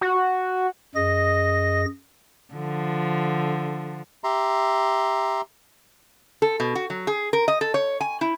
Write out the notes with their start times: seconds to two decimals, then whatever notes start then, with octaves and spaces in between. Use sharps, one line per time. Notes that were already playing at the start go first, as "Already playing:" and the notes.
0.01 F#4
0.95 F#2 G#4 D#5 A#6
2.54 D3 F3
4.24 G4 E5 A#5 C6
6.42 A4
6.60 B2
6.75 F#4
6.90 F#3
7.07 G#4
7.33 A#4
7.48 D#5
7.61 A4
7.74 C#5
8.01 G#5
8.21 E4